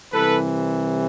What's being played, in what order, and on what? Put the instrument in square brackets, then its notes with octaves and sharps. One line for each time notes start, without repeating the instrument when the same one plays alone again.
[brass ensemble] C2 C3 E3 A4 B4